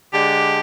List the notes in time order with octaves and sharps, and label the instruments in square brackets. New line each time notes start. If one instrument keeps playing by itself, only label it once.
[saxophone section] D3 G#3 D4 G4